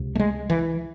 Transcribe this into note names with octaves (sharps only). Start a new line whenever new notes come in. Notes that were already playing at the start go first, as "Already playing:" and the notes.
Already playing: C#2 C3
A3
G#3
E3